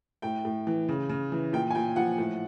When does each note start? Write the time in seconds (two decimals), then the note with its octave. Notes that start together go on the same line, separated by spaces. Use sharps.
0.22 A2 G5
0.45 A2
0.67 E3
0.89 C#3
1.09 C#3
1.32 E3
1.53 A#2 G5
1.70 G#5
1.75 A#2 G5
1.96 F3 F#5
2.18 A2